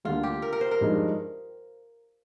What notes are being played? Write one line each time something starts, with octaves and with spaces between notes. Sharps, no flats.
D2 D3 G3 A#3 F4
G4
A#4
A#4
C5
A#4
G2 F3 G#3 D#4 G#4